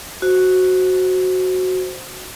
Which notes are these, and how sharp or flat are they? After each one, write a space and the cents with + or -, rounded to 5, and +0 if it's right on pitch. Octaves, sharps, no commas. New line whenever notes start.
F#4 +0 C5 +0